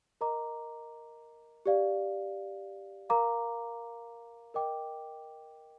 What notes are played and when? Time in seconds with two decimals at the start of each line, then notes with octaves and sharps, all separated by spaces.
0.21 A#4 D#5 A#5 D6
1.66 G4 D5 F5
3.09 A#4 F5 A#5 D6
4.54 A#4 D#5 G5 D6